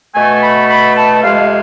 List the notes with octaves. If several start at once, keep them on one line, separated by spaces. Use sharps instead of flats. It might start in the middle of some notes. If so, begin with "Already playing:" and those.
B2 A3 G#5
B5
B5
A5
F2 C3 G#3 F5